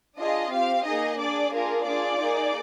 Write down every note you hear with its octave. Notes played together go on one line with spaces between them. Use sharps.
D4 F4 G#4 D#5
C4 G4 F5
A#3 D#4 G#4 D#5
D4 G#4 D5
A#3 D4 F4 G#4 A#4
D4 F4 G#4 D5
A#3 D#4 G#4